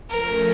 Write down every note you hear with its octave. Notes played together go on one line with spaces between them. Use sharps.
F3 A3 C#4 A#4